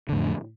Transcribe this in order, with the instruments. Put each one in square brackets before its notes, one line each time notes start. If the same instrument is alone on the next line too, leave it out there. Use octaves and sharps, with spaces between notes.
[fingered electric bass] D3
A2
F2